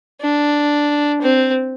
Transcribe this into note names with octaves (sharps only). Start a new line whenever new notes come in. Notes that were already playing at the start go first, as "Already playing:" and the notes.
D4
C4